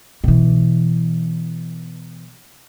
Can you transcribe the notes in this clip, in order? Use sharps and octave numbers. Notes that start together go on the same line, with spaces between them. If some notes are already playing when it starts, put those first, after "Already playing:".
B2 E3